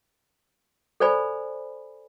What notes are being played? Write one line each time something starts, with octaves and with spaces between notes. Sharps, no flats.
A4 C5 D5 G#5 B5